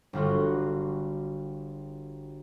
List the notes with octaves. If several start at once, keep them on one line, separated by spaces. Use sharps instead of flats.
G1 G3 F4 F#4